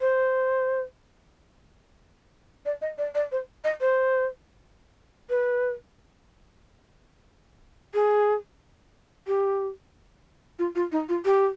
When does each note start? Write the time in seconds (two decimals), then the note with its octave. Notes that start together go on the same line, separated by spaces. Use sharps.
0.01 C5
2.65 D5
2.81 D#5
2.98 D5
3.15 D5
3.32 C5
3.64 D#5
3.81 C5
5.30 B4
7.94 G#4
9.27 G4
10.59 F4
10.75 F4
10.92 D#4
11.09 F4
11.25 G4